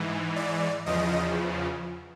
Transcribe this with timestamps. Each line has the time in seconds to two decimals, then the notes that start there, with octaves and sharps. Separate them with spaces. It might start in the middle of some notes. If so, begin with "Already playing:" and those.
Already playing: G#2 E3
0.36 D5
0.86 E2 C#3 F3 D#5